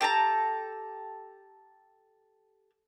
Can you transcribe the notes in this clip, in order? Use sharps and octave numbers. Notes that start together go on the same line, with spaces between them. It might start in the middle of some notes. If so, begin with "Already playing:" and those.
G4 A4 A5 A#5